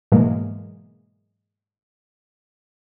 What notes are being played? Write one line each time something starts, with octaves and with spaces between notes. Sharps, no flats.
G#2 B2 E3 F#3 G#3 A#3